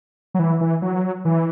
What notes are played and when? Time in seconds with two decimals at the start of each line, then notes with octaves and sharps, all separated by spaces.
0.34 F#3
0.39 E3
0.61 E3
0.82 F#3
1.25 E3